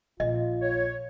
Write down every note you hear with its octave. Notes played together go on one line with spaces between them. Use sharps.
A#1 F4 D#5
C#5